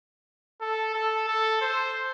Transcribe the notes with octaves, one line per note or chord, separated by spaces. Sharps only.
A4
A4
A4
C5